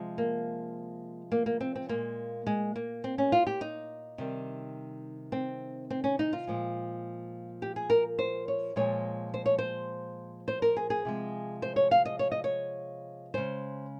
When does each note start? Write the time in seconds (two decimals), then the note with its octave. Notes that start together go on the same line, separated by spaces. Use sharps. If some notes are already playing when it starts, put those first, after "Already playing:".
Already playing: C3 F3 G#3
0.18 A#3
1.32 A#3
1.46 A#3
1.61 C4
1.75 C4
1.89 A#2 G#3 A#3
2.47 G#3
2.76 A#3
3.04 C4
3.18 C#4
3.32 F4
3.47 G4
3.61 D#4
4.18 C3 D#3 G3
5.32 C4
5.90 C4
6.04 C#4
6.19 D#4
6.33 F4
6.47 A#2 F3 G#3
7.62 G4
7.76 G#4
7.90 A#4
8.19 C5
8.48 C#5
8.76 A#2 F3 G#3 C#5
9.34 C5
9.46 C#5
9.58 C5
10.48 C5
10.62 A#4
10.76 G#4
10.90 G#4
11.05 C3 F3 G#3
11.62 C5
11.76 C#5
11.91 F5
12.05 D#5
12.19 C#5
12.32 D#5
12.44 C#5
13.34 C#3 G#3 C5